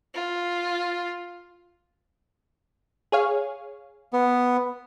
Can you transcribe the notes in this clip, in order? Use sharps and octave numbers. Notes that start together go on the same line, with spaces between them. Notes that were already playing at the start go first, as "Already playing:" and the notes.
F4
G#4 C#5 F5
B3